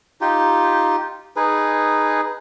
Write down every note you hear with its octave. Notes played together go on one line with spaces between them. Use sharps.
D#4 F4 G4
D#4 G#4 B4